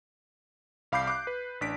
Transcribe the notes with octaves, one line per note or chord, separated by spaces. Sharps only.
C2 F5 B5 D6 G6 C7
D6 F#6
B4
A1 D4 B6 D7